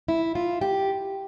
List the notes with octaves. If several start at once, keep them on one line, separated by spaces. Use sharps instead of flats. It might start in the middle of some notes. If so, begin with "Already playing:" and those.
E4
F4
G4